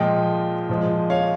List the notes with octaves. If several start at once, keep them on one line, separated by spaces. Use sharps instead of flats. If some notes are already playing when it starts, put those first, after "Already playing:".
Already playing: A#2 F3 G#3 D#5 G5
A#2 F3 G#3
C#5 F5